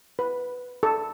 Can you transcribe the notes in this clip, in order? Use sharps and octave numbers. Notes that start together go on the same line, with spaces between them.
B4
A4